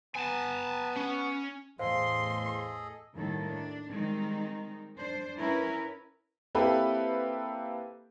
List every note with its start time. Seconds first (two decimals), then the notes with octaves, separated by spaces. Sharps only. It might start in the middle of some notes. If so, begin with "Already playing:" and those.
0.16 B3 G#5 A5
0.97 C#4
1.79 E2 A2 G#4 A4 C5 D#5 F5 C6
3.15 D#2 A2 D#3 G3 A4
3.46 D4
3.91 D#3 G3 G#3 C4 D#4
4.97 D4 C5
5.38 C#4 E4 A#4 B4
6.55 A#3 C4 E4 G4 A4 B4